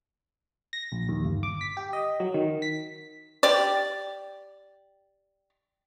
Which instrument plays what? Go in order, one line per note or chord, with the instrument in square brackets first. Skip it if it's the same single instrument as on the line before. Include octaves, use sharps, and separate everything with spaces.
[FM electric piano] A#6
A#1
D#2
G1
D6
B6
G4
D#5
F#3
D#3
B6
[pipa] G4 D5